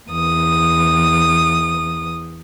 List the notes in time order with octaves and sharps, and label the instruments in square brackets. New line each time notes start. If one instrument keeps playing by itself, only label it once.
[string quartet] E2 D#6